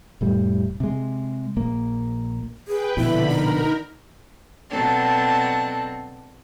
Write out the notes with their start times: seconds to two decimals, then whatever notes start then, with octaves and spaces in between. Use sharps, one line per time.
0.21 F1 A2 G3
0.80 C3 G#3
1.57 A#1 A#3
2.68 G#4 B4 G5
2.97 A#1 B2 D3 E4 B5
3.28 D#4 A#4
4.70 B2 F#3 C4 D4 A4